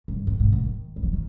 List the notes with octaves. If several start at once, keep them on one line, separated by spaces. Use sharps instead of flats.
G2
F2
G#2
G#2
D#3
G3
F3
D#3